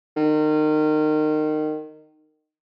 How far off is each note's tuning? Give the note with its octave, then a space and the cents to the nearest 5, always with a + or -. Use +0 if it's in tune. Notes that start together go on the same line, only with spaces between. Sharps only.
D#3 -25